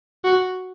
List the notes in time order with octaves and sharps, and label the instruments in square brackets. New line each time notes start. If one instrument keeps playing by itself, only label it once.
[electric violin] F#4